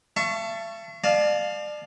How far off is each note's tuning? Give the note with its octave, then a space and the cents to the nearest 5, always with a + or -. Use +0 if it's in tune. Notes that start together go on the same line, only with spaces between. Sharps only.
E5 +45 A5 +5 C#6 +0
D5 +35 F5 +0 A5 -30